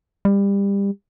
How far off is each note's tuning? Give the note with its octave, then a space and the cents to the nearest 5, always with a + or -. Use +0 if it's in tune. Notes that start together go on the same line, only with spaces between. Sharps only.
G3 +25